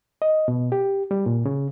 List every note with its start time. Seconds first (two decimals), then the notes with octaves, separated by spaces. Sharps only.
0.22 D#5
0.48 B2
0.72 G4
1.11 G3
1.26 A#2
1.45 C#3